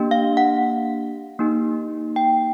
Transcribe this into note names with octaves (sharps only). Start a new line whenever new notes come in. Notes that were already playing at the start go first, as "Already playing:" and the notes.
Already playing: A#3 D4 G4
F5
F#5
A#3 D#4 G4
G5